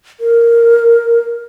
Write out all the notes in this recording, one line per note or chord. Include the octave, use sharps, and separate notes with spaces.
A#4